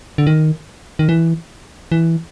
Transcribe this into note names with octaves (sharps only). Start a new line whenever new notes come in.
D3
D#3
D#3
E3
E3